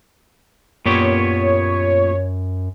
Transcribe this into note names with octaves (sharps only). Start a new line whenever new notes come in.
F#2 A#2 B3 G4 C#5